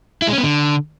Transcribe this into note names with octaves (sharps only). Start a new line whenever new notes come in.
E4
G#3
C#4
B3
D3